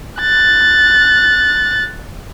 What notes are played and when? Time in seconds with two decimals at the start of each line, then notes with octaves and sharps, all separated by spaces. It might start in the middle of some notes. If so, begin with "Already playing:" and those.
0.21 F#6 A6